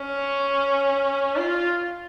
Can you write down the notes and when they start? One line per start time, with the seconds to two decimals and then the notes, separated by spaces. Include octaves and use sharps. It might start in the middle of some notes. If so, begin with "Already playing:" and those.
Already playing: C#4
1.36 F4